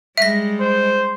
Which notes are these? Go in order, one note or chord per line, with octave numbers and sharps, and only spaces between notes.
G3 G#3 E5 A#6
C5